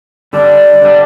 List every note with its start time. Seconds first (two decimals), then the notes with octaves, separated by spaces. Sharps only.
0.33 D3 G3 D4 D5
0.82 D3 G3 D4